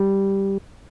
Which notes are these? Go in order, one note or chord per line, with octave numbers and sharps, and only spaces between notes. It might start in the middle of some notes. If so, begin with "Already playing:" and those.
Already playing: G3